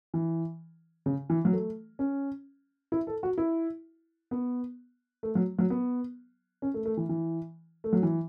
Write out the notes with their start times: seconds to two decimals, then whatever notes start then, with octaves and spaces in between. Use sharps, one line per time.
0.14 E3
1.06 C#3
1.30 E3
1.45 F#3
1.53 A3
1.99 C#4
2.92 E4
3.07 A4
3.23 F#4
3.38 E4
4.31 B3
5.23 A3
5.35 F#3
5.59 F#3
5.70 B3
6.62 C#4
6.74 A3
6.85 A3
6.97 E3
7.09 E3
7.84 A3
7.93 F#3
8.03 E3